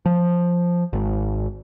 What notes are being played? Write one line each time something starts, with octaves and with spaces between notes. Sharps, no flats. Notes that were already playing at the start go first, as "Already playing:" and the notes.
F3
G#1